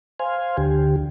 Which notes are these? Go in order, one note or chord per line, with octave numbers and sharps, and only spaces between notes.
C5 F5 G#5
D2 D3 G4